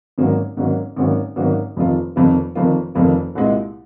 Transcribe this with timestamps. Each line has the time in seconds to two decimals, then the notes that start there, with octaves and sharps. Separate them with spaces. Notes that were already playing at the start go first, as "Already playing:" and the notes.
0.18 G#1 G#2 F#3 A#3 C#4
0.57 G#1 G#2 F#3 A#3 C#4
0.96 G#1 G#2 F#3 A#3 C#4
1.36 G#1 G#2 F#3 A#3 C#4
1.76 F1 F2 D#3 A#3 F4
2.16 F1 F2 D#3 A#3 F4
2.55 F1 F2 D#3 A#3 F4
2.95 F1 F2 D#3 A#3 F4
3.35 C2 A#2 G#3